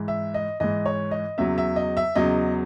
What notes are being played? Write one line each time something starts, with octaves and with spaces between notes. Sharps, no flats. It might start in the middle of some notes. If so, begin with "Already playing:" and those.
Already playing: G#2 E3
E5
D#5
G#2 E3 D#5
C#5
D#5
E2 C#3 F#3 E5
E5
D#5
E5
E2 C#3 F#3 D#5